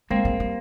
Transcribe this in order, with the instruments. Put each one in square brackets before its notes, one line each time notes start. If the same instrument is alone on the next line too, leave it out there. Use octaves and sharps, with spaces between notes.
[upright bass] G#3 [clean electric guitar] A#3 C4
[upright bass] G#3
G3